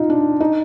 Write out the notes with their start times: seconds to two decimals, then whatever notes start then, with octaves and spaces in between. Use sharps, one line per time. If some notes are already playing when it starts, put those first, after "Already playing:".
Already playing: D#4 F4
0.10 D4
0.40 D#4